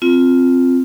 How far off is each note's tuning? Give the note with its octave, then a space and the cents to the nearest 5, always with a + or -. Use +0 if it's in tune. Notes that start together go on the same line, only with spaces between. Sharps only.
C4 +0 F4 +0